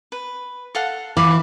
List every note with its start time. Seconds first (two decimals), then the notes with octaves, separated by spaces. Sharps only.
0.12 B4
0.75 A4 F5 F#5
1.17 E3 F5 B5 D6